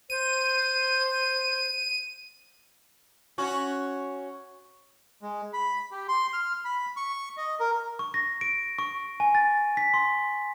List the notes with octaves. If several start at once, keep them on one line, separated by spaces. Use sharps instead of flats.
C5 D#7
C#4 F#4
G#3
B5
G4
C6
F6
B5
C#6
D#5
A#4
C#6
A#6
D7
C#6
G#5
A6
B6
C6